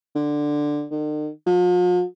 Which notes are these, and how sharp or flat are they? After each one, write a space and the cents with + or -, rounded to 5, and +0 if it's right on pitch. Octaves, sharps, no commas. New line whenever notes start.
D3 +5
D#3 -45
F3 +45